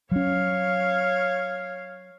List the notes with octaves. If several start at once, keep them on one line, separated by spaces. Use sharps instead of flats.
F#3 C#4 C#5 F5